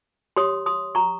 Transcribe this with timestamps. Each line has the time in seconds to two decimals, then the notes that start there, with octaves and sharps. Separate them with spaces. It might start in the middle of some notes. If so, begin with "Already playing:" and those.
0.36 G4 C#5 C6 D#6
0.66 C6 D#6
0.95 A#5 C#6